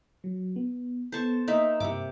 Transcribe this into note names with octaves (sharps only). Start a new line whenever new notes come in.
F#3
B3
B3 A4 C5 A5 C#6
A#3 D#4 E5
G2 C3 E5 D6